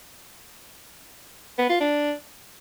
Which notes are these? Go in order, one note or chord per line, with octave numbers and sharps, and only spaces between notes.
B3
F4
D4